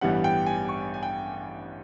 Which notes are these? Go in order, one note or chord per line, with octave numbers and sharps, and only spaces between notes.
A1 G2 E3 G3 B3 F#5
G5
G#5
C#6
G#5
G5